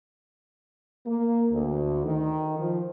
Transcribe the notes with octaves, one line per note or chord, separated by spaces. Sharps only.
A#3
D2
D#3
F3